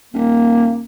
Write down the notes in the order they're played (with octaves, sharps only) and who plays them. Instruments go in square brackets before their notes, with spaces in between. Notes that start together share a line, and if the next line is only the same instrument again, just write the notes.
[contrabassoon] D#1 [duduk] A#3